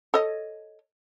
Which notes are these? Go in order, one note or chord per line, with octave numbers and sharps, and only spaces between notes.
A4 C#5 D#5